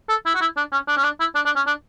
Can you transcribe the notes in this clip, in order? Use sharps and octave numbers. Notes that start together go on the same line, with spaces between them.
A4
E4
F#4
E4
D4
C#4
D4
C#4
D4
E4
D4
D4
C#4
D4